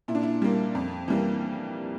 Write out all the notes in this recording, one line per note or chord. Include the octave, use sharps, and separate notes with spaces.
A#2 E4
D4
E4
G3 A#3
F2
E3 G3 A#3